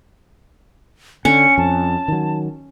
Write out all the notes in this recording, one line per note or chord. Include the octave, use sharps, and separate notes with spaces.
D3 C#4 C#7
F2 A5
D#3 F#3